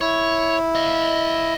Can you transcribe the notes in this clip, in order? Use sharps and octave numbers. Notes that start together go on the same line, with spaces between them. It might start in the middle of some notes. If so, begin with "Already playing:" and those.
E4 C#5
D#5 F5